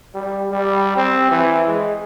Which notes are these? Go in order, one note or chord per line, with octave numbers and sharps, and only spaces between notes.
G3
G3
C4
E3
G#3